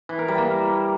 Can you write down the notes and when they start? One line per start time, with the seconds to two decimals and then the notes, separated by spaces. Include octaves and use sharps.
0.09 E3
0.19 A#4
0.28 G3
0.38 A#3